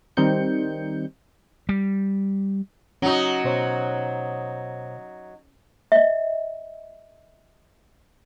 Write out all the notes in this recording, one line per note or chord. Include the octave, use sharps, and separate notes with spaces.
D#3 G3 C4 D#4 G6 C#7
G3
F#3 C#4 D#4 F#4
B2 C5 C#5
D#5 E5